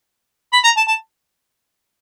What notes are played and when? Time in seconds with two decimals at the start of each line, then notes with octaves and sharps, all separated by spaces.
0.53 B5
0.64 A#5
0.77 A5
0.88 A5